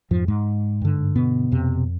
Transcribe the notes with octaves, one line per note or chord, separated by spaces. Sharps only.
F2 G#2 F3
G#2 G#3
G2 D3
B2 B3
F2 C3